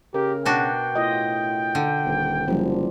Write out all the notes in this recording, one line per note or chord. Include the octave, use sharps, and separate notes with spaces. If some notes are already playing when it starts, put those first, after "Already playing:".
C#3 G4 A#4
B2 D4 F#4 G5
A2 F4 D#5
D3
D#1
F#1 F3 G3